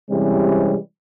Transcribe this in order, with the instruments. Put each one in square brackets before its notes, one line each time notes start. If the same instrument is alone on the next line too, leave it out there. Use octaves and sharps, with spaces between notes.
[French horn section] C3 E3 G3 G#3 C4 C#4